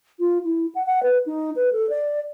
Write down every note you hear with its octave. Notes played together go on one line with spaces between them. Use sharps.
F4
E4
F#5
F#5
B4
D#4
B4
A4
D5